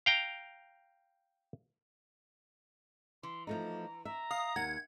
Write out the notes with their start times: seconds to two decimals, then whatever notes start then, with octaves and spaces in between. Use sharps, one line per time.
0.06 F5 G5 A#5
3.23 E3 C6
3.47 F3 A3 D#4 A#5
4.05 E5 A#5
4.31 F5 D#6
4.56 D#2 F#5 G#6